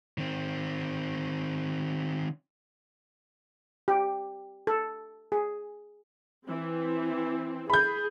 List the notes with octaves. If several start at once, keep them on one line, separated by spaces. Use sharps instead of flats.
D#3 C4
G4
A4
G#4
E3 C4
G#4 B5 G6